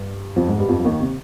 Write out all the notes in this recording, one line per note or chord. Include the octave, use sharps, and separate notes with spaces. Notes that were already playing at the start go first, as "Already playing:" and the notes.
Already playing: G2 G3
F2 F3
G#2 G#3
G2 G3
F2 F3
F3
D#2 D#3
C3